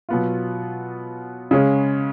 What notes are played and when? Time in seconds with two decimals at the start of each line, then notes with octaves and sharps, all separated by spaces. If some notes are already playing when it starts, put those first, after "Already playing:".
0.09 B2 F#3 B3 F4
1.51 C#3 G#3 C#4